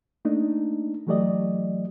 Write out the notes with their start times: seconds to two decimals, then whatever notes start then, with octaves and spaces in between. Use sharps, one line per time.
0.25 A3 A#3 D4 D#4
1.07 E3 F#3 A3 G4 D5 D#5